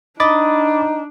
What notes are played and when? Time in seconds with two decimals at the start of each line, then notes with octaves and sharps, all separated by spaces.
0.20 D4 D#4 D#5 B5 D6 A6